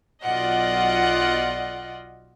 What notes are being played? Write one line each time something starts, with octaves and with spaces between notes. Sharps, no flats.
B1 F4 D5 D#5 F#5